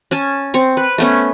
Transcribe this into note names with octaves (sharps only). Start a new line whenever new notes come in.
C#4 G#5 A5
C4 C#6
B4
A3 B3 C#4